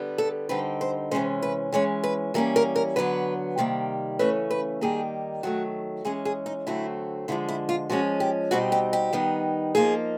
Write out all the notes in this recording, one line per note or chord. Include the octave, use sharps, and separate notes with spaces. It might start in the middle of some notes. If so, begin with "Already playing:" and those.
Already playing: D3 G3 B3
A4
D3 G3 C4 D#4 B4
C5
C3 E3 G#3 C#4 C5
B4
E3 G#3 C#4 C#5
B4
E3 G3 A#3 C#4 A#4
A#4
A#4
D3 F#3 B3 B4
C3 D#3 G3 A#3
C#3 E3 A3 C#4 B4
B4
D#3 G3 A#3 D#4 G#4
D#3 F#3 A3 F#4
E3 G#3 C#4 G#4
G#4
D#4
D3 F#3 A3 C4 E4
D3 F3 G#3 E4
E4
F4
F3 G#3 C#4 F#4
G4
B2 G3 C4 D#4 F#4
G4
G4
D#3 G3 B3 D#4
F3 A#3 D#4 G#4